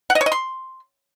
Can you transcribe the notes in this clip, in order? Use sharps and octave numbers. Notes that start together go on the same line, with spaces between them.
F#5
D#5
C#5
D#5
C6